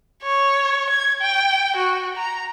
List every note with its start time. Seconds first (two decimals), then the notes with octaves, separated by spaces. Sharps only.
0.23 C#5
0.90 G#6
1.21 G5
1.76 F#4
2.17 A#5